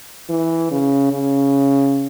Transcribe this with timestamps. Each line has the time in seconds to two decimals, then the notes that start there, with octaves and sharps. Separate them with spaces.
0.29 E3
0.71 C#3
1.12 C#3